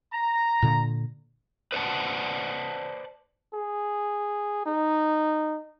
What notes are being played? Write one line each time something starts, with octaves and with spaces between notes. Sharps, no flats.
A#5
A#2 D3
B4 C5 D5 D#5 F#5 A5
G#4
D#4